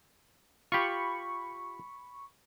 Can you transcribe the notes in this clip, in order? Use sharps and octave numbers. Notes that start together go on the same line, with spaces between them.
F4 G4 B5 C#6